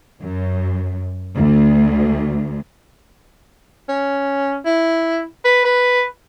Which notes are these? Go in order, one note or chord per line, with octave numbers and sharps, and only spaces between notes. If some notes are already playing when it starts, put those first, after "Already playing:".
F#2
D2
C#4
E4
B4
B4